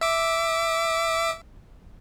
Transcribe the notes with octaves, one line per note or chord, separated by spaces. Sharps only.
E5 D6